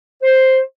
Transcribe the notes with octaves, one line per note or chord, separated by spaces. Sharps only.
C5